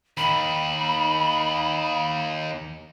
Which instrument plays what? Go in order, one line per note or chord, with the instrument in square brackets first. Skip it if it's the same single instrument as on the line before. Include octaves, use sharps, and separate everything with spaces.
[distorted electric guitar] D#2 D#3 [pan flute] B5